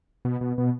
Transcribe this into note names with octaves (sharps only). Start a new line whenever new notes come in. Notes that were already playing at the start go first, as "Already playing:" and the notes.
B2
B2
B2